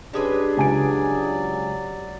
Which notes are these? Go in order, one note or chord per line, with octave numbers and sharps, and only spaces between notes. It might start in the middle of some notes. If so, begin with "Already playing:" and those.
G3 G#3 C#4 D4 G#4 B4
C#2 F#3 D5 G#5 D7